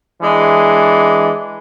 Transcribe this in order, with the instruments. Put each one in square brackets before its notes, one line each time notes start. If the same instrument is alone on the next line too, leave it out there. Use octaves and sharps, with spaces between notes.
[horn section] E3 G#3 D4